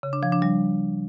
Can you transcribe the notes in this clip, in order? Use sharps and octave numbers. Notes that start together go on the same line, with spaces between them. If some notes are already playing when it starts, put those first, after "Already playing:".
C#3
D4
F3
D4
G3